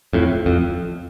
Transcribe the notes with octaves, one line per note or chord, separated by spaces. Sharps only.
F2 A2
F2